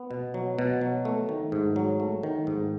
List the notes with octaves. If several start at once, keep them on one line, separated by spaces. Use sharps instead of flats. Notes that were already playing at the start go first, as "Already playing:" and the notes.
Already playing: B3
B2
F#3
B2
F#3
A3
D#3
G#2
F#3
A3
D#3
G#2